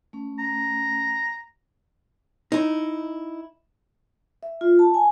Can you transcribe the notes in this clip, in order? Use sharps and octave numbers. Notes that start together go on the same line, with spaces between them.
A3 C#4
A#5
D#4 E4
E5
F4
A5
G#5